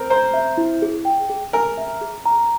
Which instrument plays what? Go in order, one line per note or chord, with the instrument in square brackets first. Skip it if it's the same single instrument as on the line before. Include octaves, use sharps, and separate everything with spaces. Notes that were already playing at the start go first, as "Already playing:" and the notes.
Already playing: [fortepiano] C4 A#4
[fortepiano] C5 [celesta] A#5
[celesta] E5
E4
G#4
G5
G#4
[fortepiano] A#4 [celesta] G#5
[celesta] E5
G#4
A#5